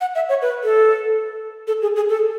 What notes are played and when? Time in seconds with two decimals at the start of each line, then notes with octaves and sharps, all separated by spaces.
0.01 F#5
0.15 E5
0.29 C#5
0.42 B4
0.64 A4
1.67 A4
1.82 G#4
1.96 G#4
2.09 A4